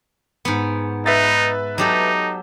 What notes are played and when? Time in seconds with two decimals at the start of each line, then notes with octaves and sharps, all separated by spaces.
0.45 G#2 B3
1.06 D#4 B4 E5 A6
1.78 F#3 D#4 G4 A4